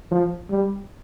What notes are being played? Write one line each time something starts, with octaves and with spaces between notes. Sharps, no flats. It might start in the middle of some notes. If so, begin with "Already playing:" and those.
F3
G3